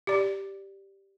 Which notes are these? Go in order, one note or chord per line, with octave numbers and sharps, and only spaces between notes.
G4 D5